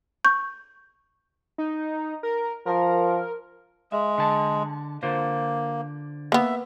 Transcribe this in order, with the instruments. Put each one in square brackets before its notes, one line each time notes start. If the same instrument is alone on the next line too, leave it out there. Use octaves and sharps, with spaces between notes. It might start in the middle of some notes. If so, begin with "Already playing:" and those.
[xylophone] C#6 G6
[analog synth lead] D#4
A#4
[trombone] F3 [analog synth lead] A#4
[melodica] G#3 [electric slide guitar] E5
[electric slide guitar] D3 A5
[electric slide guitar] D3 F4 C5 [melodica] A#3
[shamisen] A#3 B3 [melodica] E5